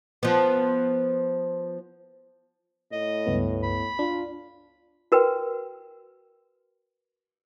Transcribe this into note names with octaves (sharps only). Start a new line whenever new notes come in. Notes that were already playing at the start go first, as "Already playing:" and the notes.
F3 B3
A2 D#5
C#2 G2 B3
B5
D4 F4
F#4 A#4 B4 G5